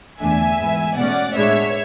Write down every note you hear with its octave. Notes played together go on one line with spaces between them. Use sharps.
E2 D3 A3 D4 E5 G#5
G#2 E3 B3
B2 A3 C#4 D5 F#5
A2 G#3 B3 D4 C#5 E5